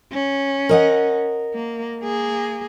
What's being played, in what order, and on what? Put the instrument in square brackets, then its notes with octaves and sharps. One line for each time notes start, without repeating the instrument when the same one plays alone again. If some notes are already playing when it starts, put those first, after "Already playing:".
[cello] C#4
[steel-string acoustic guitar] A#4 D#5 F#5
[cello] A#3
A#3 G#4